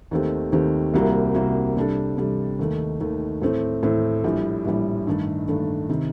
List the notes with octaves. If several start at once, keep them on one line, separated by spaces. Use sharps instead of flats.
D#2 D#3 A3 C4 G4
D#2 D#3 A3 C4 G4
C2 C3 G3 A#3 F#4
C2 C3 G3 A#3 F#4
C3 G3 D4 A4
C3 G3 D4 A4
D#2 D#3 A3
D#2 D#3 A3
A2 A3 C4
A2 A3 C4
A#1 A2 G3
A#1 A2 G3
G2 D#3 A3 D4 A4
G2 D#3 A3 D4 A4
C3 D#3